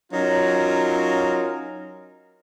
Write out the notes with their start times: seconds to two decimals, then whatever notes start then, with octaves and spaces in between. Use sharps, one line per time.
0.12 F#3 C#4 D#4 F4 A#4